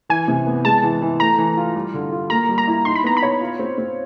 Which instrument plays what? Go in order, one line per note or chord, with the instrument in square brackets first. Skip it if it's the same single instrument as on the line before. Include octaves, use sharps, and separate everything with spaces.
[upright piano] E3 [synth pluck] G#5
[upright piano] C3
B3
[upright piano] G#3 [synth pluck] A5
[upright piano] E3
E3
[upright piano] A3 [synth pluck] A#5
[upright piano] E3
F4
G3
D3
F4
[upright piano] A#3 [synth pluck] A#5
[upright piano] G3
[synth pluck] A#5
[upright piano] E4
[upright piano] D#4 [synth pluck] C6
[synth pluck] B5
[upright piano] B3 [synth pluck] A#5
[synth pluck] B5
[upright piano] C#5
F4
C4
C4